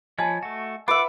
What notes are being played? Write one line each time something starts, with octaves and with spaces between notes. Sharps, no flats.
F3 C#5 D#5 G#5 A5 B5
A3 F#4
F4 B4 E5 F#5 D6